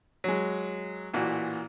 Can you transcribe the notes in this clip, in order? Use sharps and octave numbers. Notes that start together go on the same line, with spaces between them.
F#3 G#3
A1 A#2 E3 F#4